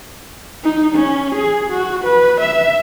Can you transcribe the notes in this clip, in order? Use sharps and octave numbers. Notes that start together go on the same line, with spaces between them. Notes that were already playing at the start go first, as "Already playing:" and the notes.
D#4
C#4
G#4
F#4
B4
E5